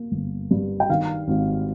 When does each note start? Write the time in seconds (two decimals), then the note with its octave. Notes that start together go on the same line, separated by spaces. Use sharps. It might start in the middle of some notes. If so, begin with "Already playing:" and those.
Already playing: A#3
0.12 G1
0.51 G2
0.80 G5
0.89 D#3 F5
1.28 G#1